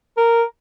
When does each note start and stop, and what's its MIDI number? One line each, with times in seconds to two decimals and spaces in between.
0.17 0.43 70